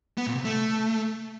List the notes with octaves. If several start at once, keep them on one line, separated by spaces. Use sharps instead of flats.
B3
A#2
C3
A3